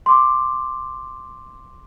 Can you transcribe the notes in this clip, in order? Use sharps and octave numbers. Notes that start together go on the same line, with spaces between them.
C6 D6